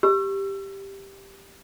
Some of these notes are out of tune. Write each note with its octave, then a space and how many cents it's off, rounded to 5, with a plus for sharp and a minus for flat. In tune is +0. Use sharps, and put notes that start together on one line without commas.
G4 +0 E6 +35